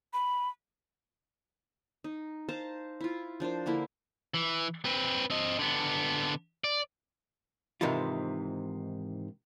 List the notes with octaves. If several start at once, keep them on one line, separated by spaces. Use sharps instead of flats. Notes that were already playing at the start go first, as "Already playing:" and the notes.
B5
D#4
C5 F5 A5 A#5
E4 F4
F3 D4 A#4 C5
D3 A#3 E4
E3
C4 B4
C4 D#5
D3 B3
D5
G#2 C3 D#3 E3 F4